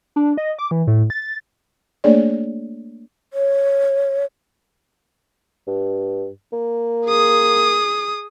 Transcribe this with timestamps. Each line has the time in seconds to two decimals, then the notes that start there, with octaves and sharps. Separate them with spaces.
0.16 D4
0.37 D#5
0.59 D6
0.71 E3
0.87 A2
1.10 A6
2.04 A3 A#3 D4 G#4 C#5 D5
3.33 C#5
5.67 G2
6.53 A#3
7.07 G#4 D#6